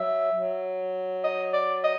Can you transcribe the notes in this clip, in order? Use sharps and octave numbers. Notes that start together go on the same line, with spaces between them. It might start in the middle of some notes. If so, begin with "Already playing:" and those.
Already playing: F#3 E5
F#3
D#5
D5
D#5